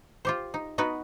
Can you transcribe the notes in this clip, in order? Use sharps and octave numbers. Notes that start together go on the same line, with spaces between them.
F4 G4 C5
D#4
B3 D#4 F#4 B4